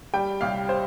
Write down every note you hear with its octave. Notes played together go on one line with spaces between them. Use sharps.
G3 G5
C2 F5
C5